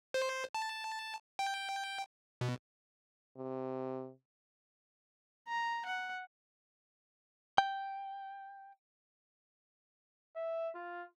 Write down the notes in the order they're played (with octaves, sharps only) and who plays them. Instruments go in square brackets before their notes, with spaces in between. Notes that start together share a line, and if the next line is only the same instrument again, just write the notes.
[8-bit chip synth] C5
A5
G5
B2
[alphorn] C3
[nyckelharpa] A#5
F#5
[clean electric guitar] G5
[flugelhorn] E5
F4